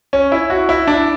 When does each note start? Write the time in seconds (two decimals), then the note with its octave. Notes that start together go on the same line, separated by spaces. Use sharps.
0.13 C#4
0.32 E4
0.50 F#4
0.69 E4
0.87 D4